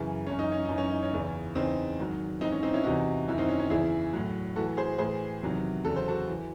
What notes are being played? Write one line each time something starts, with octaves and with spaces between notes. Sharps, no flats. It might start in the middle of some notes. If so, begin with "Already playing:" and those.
Already playing: F#2 C#3 E3
F#2 E3 C#4
D#4
C#4
F#2 E3 D#4
C#4
D#4
C#4
E2 C#3 E3
E2 C#3 E3 C4 D#4
G#2 D#3 F#3
G#2 E3 C4 D#4
C#4
C4 D#4
C#4 E4
E2 C3 E3 D#4 F#4
F#2 D#3 F#3 E4
C4 D#4
C#4
C#4
E2 C#3 E3 E4 G#4
A2 F#3
A2 E3 F#4 A4
G#4 C5
A2 E3 G#4 C5
E2 C3 D#3 F#3
E2 C#3 F#3 A4
C5
F#4 A4
E3